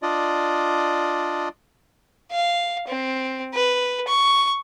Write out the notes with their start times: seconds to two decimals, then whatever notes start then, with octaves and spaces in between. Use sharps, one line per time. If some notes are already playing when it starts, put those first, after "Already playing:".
0.02 D4 F4 D5 D#5
2.32 F5
2.88 C4
3.54 B4
4.08 C#6